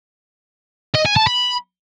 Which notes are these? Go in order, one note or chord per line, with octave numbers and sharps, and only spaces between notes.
D#5
G#5
A5
B5